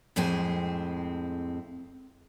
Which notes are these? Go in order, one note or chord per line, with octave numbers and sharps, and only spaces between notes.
F2 A2 G#3 C4 G#5